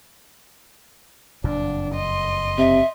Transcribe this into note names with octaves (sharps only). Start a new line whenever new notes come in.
F#1 F2 A#2 D4
D#5 C6
C3 E5